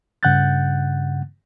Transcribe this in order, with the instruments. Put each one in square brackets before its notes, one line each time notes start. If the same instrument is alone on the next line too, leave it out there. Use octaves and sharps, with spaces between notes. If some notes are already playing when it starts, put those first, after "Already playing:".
[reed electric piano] G2 C#3 F#5 F#6 G6 A6